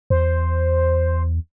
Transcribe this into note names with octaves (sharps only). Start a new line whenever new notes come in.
E2 C5